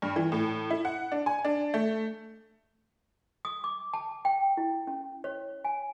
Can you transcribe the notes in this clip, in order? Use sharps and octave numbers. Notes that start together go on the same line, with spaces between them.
G2
E3
A2
E4
F#5
D4
G#5
D4
A3
D#6
D6
A5
G5
E4
C#4
C#5
G#5